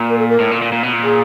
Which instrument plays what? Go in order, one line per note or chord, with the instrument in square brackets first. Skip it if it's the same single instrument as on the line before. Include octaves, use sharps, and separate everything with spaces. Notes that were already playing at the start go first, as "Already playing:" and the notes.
Already playing: [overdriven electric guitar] A#2
[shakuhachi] A#4
A4
A#4
[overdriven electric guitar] A2
A#2
A#2
A#2
B2
A#2
[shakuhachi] G#4